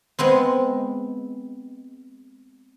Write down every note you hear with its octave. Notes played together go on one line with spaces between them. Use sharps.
G#3 B3 C4